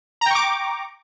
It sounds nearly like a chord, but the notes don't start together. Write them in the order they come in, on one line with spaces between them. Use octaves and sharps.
A#5 G5 C#6 D6